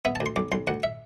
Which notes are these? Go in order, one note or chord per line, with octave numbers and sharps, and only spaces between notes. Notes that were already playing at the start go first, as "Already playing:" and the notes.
B3 E5
A5
D2
C6
B1 D6
B1 C6
D2 F#5
E5